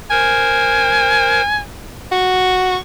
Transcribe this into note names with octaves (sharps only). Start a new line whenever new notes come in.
A#4 C5 G#5
F#4 C#6